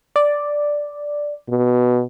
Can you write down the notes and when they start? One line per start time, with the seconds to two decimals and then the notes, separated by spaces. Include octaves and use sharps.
0.16 D5
1.49 B2